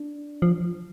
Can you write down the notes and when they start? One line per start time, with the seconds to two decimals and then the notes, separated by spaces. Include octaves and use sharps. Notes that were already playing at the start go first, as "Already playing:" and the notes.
Already playing: D4
0.42 F3